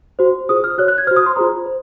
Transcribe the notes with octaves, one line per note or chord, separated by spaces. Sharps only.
F#4 C5
F4 G#4 C5 D#6
F6
F#4 C#5 F#6
F#6
G#6
F#4 C5 F6
D#6
C6
F4 G#4 C5 A#5
C5